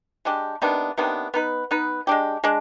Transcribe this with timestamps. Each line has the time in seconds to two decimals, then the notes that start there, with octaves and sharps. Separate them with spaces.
0.25 G#3 D4 G4
0.62 C3 D#3 B3 D4
0.98 C3 D#3 B3 D4
1.34 B3 D#4 B4
1.71 B3 D#4 B4
2.07 G#3 D4 G4
2.44 G#3 D4